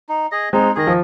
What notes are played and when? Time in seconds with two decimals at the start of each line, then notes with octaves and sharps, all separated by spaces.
0.09 D#4
0.32 G#4 D#5
0.53 G#3 C4 D#4
0.75 D#3 G#4 D#5
0.87 F3